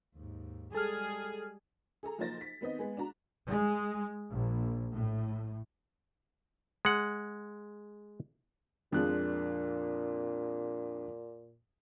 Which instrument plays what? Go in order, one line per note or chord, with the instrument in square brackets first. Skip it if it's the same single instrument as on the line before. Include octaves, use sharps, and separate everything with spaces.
[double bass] D#2 G#2
[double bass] G3 G#3 [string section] G#4 [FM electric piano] A4 F6
[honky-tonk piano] G#4 A4 A#5
B1 F3 A#3 C5 A6 A#6
B6
D#3 B3 C4 D#5
G#3 B3 G#4
D4 F#4 A#5
[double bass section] G#3
A#1
A2
[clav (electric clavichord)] G#3 F#5
[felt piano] F2 F3 G#3 [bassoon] A#2 [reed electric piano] D4 F#6